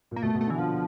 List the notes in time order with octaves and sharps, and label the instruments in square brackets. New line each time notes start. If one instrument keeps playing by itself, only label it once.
[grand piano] A#2
[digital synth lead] A#3
[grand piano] B2 [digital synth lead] A3
[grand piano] B2
[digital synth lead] A3
[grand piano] D3
[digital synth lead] E3
[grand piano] D3 [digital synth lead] F3